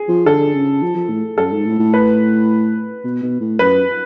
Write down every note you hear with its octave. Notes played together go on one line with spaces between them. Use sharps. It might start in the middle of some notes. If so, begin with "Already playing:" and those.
Already playing: G#4
F3
D3 A4
C#3
F3
F3
A2
F#2 A4
G#2
A2
A2
B4
B2
B2
A2
F#2 B4